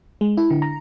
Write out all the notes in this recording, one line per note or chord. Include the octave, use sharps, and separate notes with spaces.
G#3
E4
D3
A#5